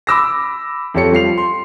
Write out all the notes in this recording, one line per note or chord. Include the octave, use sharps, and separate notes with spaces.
B5 D6 E6 A#6
F2 G4 A4 C#5 C#7
G3 F4 C7 F7
C6